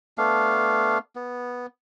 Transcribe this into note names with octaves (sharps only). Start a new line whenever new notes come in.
A3 B3 D4 F5
B3